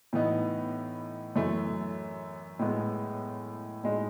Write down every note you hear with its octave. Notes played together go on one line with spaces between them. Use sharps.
A2 E3 B3 D#4
F#2 E3 A3
A2 G#3 B3
A2 G#3 D#4